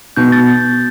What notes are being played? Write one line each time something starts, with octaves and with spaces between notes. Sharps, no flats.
B2 G6
A6